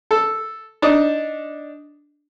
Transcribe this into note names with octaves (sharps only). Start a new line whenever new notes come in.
A4
D4 D#4 D#6